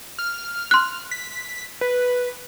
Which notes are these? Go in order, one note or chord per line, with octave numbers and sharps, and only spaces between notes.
F6
C6 F#6
B6
B4